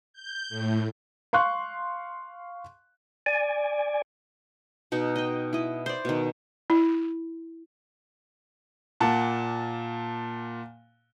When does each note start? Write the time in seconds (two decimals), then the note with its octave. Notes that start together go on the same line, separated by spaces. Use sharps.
0.13 G6
0.49 A2
1.33 F5 C6 C#6 F#6
3.26 D5 G#5
4.92 B2 D#4 F#4
5.16 D#5 G5
5.53 E4 D#5
5.86 C5 D5
6.05 B2 D#3
6.70 E4
9.01 A#2 A#3 F#5 A5